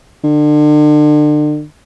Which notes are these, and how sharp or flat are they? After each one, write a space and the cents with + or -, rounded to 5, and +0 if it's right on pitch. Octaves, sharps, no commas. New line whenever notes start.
D3 +35